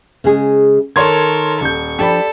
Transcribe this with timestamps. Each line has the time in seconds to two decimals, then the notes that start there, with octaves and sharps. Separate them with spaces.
0.24 C#3 G#3 G#4
0.96 D#3 A4 A#4 C#5 C6 G#6
1.61 D#1 C#6 G6
1.99 F3 D4 G4 A4 D5 B5